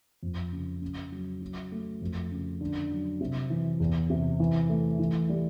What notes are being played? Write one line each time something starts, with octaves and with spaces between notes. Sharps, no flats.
F2
C#3
C#3
F#3
F#3
A3
F2
C#3
D3
F#3
C3
E3
E2
C3
E3
A3
E3
G3